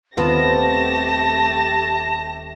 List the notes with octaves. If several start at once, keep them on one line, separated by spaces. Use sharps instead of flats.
D#1 A3 B3 C4 F4 G4 A5 A#6